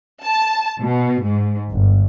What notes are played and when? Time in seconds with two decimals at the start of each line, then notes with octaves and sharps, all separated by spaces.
0.24 A5
0.81 B2
1.23 G#2
1.71 G1